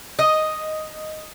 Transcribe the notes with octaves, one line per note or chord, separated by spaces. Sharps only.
D#5